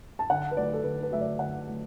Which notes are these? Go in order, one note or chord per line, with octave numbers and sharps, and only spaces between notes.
A5
D3 F#5
B4
F#3 A3 D5
A4
D3 B4
B4
F#3 A3 E5
D5
D3 F#5
F#3 A3